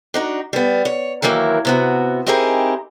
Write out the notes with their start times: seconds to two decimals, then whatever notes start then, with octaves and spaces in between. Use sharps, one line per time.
0.14 D4 D#4 F#4
0.53 G3 B3
0.85 C#5
1.22 D#3 E3 F#3 A#3 E4
1.65 C3 B3 F#4
2.27 C4 D#4 E4 G4 G#4 A#4